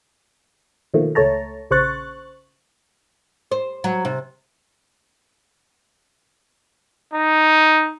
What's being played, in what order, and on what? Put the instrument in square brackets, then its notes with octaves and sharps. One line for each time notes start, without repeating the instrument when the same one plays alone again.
[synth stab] B2 D#3 F3 A3 A#3
C#2 A3 C#5 A5 A#5
A#1 C#3 C5 C#6 F#6 A6
[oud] C5
F#3
C3
[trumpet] D#4